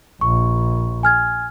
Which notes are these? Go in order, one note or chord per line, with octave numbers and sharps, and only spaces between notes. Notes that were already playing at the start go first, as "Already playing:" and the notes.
A#1 C#6
G#5 F6 G#6